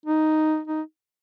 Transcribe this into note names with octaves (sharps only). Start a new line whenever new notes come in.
D#4
D#4